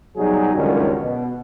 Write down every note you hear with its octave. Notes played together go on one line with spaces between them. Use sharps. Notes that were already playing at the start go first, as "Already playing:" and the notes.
B2 F#3 G3 D#4 G#4
C#2 F#2 D3 D#3 G3 C#4
B2